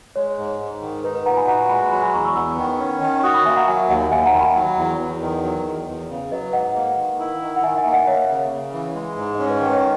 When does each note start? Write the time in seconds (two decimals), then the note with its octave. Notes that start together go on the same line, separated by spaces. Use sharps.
0.16 G#3 C#5
0.38 G#2
0.60 G#2
0.82 D#3
1.04 D#4 B4
1.15 B4
1.26 A#2 F#5 A#5
1.37 G#5 B5
1.48 F#4 F#5 A#5
1.69 G#3 G#5 B5
1.92 F#3 G#5 B5
2.02 G#5 B5
2.13 E2 A#5 C#6
2.24 C#6 E6
2.35 B3 C#6 E6
2.58 D#3
2.80 C#4
3.01 D#3
3.23 F#4 D#6 F#6
3.34 B5 D#6
3.45 A#3 E5 G#5
3.56 F#5 A#5
3.67 F#3 E5 G#5
3.89 D#2 D#5 F#5
4.11 D#2 E5 G#5
4.26 F#5 A#5
4.33 D#3
4.41 G#5 B5
4.55 F#3
4.77 E2
5.00 E2
5.21 D#3
5.43 F#3
5.65 E2
5.88 E2
6.09 C#3
6.31 F#3 B4 D#5
6.53 G#2 D#5 F#5
6.75 A#3
6.97 D#3
7.20 E4
7.41 D#3
7.56 F#5
7.63 D#3 E5 G#5
7.78 E5 G#5
7.85 A#3
7.93 D#5 F#5
8.07 A#3 C#5 E5
8.29 C#3
8.52 C#3
8.73 E3
8.95 G#3
9.17 G#2
9.35 D#5
9.39 C#4 C#5
9.50 B4 D#5
9.61 D#3 D#5
9.72 C#5